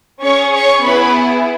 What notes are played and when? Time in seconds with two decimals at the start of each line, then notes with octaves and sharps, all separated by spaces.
0.22 C#4 G#4 C#5 C#6
0.53 C#5 C#6
0.84 B3 E4 G#4 B4 B5